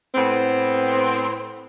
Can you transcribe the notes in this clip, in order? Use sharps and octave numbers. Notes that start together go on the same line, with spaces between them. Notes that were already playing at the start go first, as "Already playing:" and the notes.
A2 B3 C4